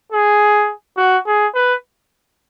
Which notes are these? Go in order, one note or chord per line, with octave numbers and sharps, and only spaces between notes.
G#4
F#4
G#4
B4